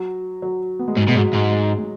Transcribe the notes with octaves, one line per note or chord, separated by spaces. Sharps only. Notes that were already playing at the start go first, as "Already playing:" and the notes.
Already playing: F#3
F#3
B3
G#3
G#2 F#3
B2 G#3
G#2 F#3
G#2 G#3
G#3
G#3